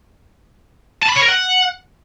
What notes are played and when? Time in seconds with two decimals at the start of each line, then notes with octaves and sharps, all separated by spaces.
1.02 A5
1.09 B5
1.15 C#5
1.22 A#4
1.28 F#5